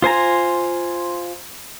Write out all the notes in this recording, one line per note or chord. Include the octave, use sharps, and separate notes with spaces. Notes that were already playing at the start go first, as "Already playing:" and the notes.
F4 C5 G#5 A#5